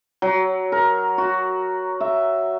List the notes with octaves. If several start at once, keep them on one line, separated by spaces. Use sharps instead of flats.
F#3
A#4
F#4
E5